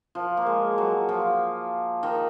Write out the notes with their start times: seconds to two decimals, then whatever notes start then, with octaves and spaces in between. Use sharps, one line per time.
0.15 F3
0.37 A#3
0.46 G#3
0.78 F#3
1.09 F3
2.03 D#3